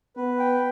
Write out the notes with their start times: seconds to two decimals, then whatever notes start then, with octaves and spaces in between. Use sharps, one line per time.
0.16 B3 B4
0.39 G5